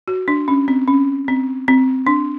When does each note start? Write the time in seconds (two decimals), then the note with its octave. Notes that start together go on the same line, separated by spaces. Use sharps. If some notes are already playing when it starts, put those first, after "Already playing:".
0.08 F#4
0.28 D4
0.48 C#4
0.68 C4
0.88 C#4
1.28 C4
1.68 C4
2.07 D4